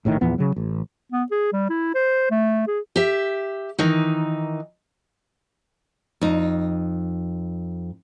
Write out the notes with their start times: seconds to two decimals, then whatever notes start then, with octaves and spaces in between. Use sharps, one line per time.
0.05 A#1 A2 C3 D#3
0.21 E2 A#2 F3 B3
0.38 C#3 F#3
0.56 A1
1.12 B3
1.31 G#4
1.52 G3
1.69 E4
1.95 C5
2.31 A3
2.67 G#4
2.96 G4 E5
3.79 D#3 E3 D#4
6.21 F2 D#4